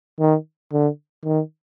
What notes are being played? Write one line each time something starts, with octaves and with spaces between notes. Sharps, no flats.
D#3
D3
D#3